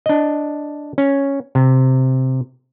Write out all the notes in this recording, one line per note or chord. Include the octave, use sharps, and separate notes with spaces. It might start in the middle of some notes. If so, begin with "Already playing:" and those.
D4 D#5
C#4
C3